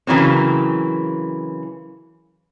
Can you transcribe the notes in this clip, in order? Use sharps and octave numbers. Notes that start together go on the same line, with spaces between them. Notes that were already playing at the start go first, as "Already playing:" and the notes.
C#3 E3 F#3 A#3 C4